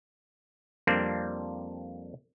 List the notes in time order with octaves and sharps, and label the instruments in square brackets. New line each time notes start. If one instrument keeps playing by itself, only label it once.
[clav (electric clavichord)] F2 G3 A#3 C4 D4